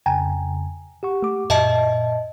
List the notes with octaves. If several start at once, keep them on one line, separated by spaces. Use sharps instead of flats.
F2 C#3 G5 G#5 A#5
G4 F#5 C#6
A3 D6
F#2 A#2 D#5 E5 A5